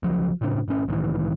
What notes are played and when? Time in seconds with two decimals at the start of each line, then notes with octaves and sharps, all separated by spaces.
0.03 C#2 F3 F#3
0.41 D1 A2 C#3 D4
0.68 G#1 C#4
0.88 C2 A2 D#3 E3